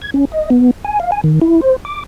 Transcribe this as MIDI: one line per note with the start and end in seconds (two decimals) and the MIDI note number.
0.02 0.11 92
0.14 0.25 61
0.32 0.50 75
0.50 0.71 59
0.84 0.99 80
1.00 1.11 77
1.12 1.21 80
1.24 1.39 51
1.41 1.61 64
1.61 1.76 72
1.85 2.04 86